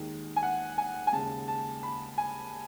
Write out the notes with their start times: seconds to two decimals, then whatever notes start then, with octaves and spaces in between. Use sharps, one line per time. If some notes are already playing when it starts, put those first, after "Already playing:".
Already playing: D#2 D#3 G#3
0.36 G#5
0.43 F#5
0.78 G#5
1.07 G#5
1.13 D#2 C#3 G#3 A5
1.48 A5
1.83 B5
2.18 G#5